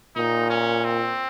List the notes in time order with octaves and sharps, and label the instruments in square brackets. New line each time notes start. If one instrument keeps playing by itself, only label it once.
[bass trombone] A#2 [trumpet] D#4
[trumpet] C#4
C4